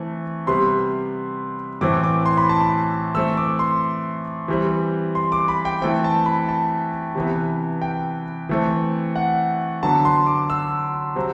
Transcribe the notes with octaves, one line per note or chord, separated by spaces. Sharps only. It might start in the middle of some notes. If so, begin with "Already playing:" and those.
Already playing: E3 A3 C4
C3 G3 B3 C6
A2 E3 A3 C4 D6
D6
C6
B5
A5
B5
E3 A3 C4 E6
D6
C6
E3 G3 C4
C6
D6
B5
G5
E3 A3 C4 G5
A5
B5
A5
C3 E3 B3
G5
E3 A3 C4
F#5
D3 F#3 B3 A5
C6
D6
E6
C3 F#3 C4